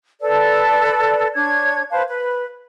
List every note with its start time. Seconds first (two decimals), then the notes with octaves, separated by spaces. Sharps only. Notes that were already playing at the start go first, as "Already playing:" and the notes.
0.21 A4 B4 D5
1.35 D4 C#5 G#6
1.91 B4 C5 F5 A5
2.08 B4